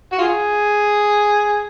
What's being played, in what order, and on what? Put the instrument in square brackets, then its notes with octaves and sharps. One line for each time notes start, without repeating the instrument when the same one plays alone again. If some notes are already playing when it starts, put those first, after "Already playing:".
[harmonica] F#4
F4 G#4